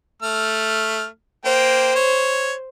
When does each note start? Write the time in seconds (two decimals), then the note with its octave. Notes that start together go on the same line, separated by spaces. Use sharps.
0.22 A3 F6
1.45 A#3 C5 G5
1.95 C#5